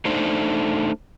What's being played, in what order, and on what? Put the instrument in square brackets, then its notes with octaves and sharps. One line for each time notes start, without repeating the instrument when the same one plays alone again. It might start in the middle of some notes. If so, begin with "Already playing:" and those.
[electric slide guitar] A3 D4 D#4 C5